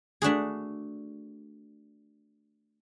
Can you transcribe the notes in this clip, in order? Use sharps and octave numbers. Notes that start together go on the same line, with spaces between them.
A3 D4 F#4 G#4